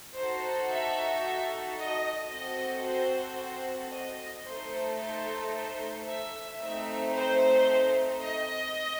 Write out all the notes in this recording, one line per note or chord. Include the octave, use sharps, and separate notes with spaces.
D#4 F#4 A4 C5
E5
D#5
C4 F#4 A4 D#5
C5
C5
D#5
A3 D#4 A4 C5
C5
C5
E5
A3 C4 D#4 E5
C5
D#5